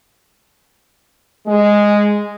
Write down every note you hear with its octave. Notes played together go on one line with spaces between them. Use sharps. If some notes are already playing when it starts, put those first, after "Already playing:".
G#3